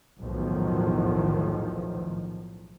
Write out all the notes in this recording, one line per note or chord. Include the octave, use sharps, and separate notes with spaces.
B1 E2 A2 D#3 F3